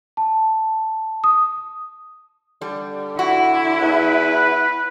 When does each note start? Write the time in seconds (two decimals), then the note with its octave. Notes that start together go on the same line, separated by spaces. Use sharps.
0.17 A5
1.24 D#6
2.62 D3 G3
3.19 E4 F#4
3.81 E2 B4